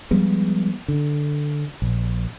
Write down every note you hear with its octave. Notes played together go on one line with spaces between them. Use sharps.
F3 G3 G#3 B3
D3
A#1